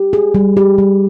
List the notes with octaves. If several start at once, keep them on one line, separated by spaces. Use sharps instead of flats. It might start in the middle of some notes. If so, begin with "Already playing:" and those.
Already playing: G4
G#4
G3
G4
G3